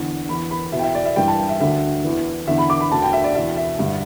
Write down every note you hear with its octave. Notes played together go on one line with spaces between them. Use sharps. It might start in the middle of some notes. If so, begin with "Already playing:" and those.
Already playing: E2 D3
E2 E3 B5
B5
E2 B2 E5
G5
E5
D5
E5
G2 E3 G5
A5
G5
E5
D2 D3 E5
E2 E3
E2 D3 E5
B5
D6
B5
D2 D3 A5
G5
E5
D5
E2 B2 E5
E5
G2 D3